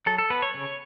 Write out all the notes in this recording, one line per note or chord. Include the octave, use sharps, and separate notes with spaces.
F#3 A4
A4
B3 B4
C#5
C#3